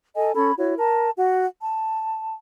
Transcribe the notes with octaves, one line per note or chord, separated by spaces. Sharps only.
A4 D#5 G#5
C#4 A4 B5 G#6
E4 F#4 C#5
A#4 A5
F#4 F#5
A5